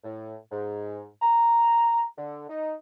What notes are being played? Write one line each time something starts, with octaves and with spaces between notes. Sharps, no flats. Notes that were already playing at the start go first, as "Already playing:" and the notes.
A2
G#2
A#5
D3
D#4